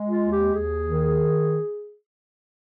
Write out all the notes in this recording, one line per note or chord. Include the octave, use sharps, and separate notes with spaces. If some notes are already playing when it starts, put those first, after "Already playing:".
Already playing: G#3
F4
D#2
G4
D#2 G#4
D#3